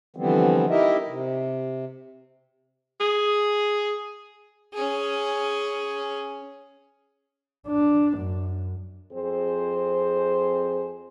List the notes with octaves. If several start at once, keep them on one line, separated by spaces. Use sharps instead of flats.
D3 E3 F3 G3 B3 C4
D#4 E4 G4 A#4 D#5 E5
C3
G#4
C#4 G#4
D4
F#2
F2 C4 G#4 C5